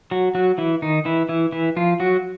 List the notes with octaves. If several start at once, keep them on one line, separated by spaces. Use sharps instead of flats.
F#3 F#4
F#3 F#4
E3 E4
D#3 D#4
E3 E4
E3 E4
E3 E4
F3 F4
F#3 F#4